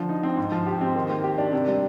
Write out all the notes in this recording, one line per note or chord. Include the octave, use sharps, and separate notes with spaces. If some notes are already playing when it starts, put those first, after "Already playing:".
Already playing: D3 F3
D#4
C4
G#2
F3
G4
C4
D#3
A#3
G4
D4
C3
G3